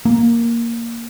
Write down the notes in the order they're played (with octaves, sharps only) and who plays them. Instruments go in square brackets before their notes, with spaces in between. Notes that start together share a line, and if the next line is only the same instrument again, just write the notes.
[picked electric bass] A#3